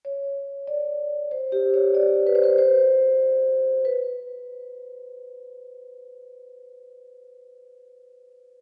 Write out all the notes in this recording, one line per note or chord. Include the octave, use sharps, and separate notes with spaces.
C#5
D5
C5
G4
C#5
D5
B4
C5
B4
C5
B4